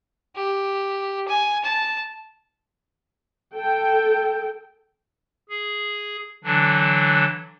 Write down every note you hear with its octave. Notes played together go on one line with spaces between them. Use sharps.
G4
G#5
A5
A4 G5
G#4
D3 E3 F#3 D4